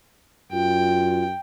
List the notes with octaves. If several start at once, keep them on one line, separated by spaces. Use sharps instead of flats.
F#2 F4 G5